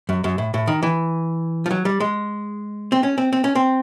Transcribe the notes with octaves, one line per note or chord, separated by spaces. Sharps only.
F#2
F#2
A2
A2
D#3
E3
F3
F#3
G3
G#3
C4
C#4
C4
C4
C#4
C4